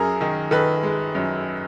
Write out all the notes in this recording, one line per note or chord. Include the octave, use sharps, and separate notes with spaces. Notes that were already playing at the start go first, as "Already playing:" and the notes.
Already playing: F#2 G#4 A#4
D#3
D#3 A4 B4
G#3
F#2